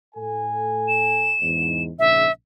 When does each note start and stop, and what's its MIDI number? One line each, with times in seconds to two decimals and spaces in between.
0.16 1.35 45
0.16 1.35 69
0.16 1.35 80
0.88 1.83 100
1.41 1.90 40
1.41 1.90 44
1.99 2.26 34
1.99 2.26 44
1.99 2.26 49
1.99 2.31 76